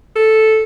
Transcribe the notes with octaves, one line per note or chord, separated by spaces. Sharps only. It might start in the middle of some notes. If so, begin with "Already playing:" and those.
A4